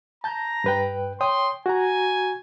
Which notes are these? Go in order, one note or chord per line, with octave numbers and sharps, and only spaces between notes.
A5 A#5 G6
G2 B4 G5
C#5 G5 C6 D#6
F#4 G#5 A#5